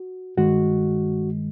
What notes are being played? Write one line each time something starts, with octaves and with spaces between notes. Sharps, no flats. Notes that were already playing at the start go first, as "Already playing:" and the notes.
Already playing: F#4
G2 D#3 G#3 F#4